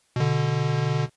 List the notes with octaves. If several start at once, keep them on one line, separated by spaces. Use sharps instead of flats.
B2 D3